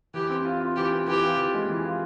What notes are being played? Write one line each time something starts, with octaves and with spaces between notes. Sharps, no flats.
E3 G4
C4
F4
F4
E3 G4
C4
E3 G4
F4
E3
G#3
E3
F4